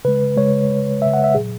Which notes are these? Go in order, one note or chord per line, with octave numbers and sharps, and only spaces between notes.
C#3 G#3 B4
C#3 G#3 C#5
C#3 G#3
C#3 G#3 E5
F#5
E5
A#2 F#3 G#4